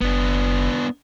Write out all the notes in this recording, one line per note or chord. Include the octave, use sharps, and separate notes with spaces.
F#1 B3 D4